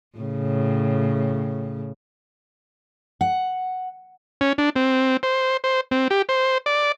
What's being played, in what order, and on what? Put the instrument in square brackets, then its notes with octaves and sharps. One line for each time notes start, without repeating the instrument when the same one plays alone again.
[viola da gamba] A2 C#3
[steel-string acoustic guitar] F#5
[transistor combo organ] C#4
D4
C4
C5
C5
C4
G4
C5
D5